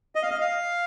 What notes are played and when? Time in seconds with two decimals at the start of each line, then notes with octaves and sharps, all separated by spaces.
0.15 D#5
0.23 F5
0.30 D#5
0.41 F5